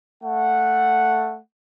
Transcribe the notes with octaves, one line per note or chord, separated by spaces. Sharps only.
A3 F#5